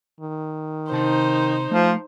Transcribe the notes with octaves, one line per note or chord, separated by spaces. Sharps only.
D#3
C3 D#4 C5 A5 C6
F3 A3